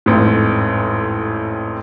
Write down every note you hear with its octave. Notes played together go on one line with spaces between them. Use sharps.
A1 F2 G#2